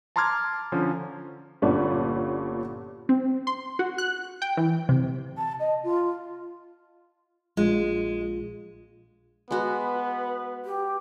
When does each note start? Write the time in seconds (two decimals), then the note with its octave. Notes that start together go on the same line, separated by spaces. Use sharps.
0.16 A5 A#5 C6 D6 F6 G#6
0.72 D3 F3 C#4
1.62 G1 A#2 G3 B3 C#4 D4
3.09 C4
3.47 C6
3.79 F#4
3.98 F#6
4.42 G5
4.57 E3
4.89 C3
5.38 A5
5.60 D#5
5.84 F4
7.57 A#1 G#3 F4
9.51 G#3 B3 F#4 B4
10.65 G4